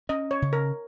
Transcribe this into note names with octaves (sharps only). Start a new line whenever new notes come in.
C#4 D#5
C#5
C#3
A#4